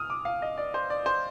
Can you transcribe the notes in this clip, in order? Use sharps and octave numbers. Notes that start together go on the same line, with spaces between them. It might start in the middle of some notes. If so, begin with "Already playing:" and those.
Already playing: B2 D#6 F6
D6
F5
D#5
D5
C5
D5
C5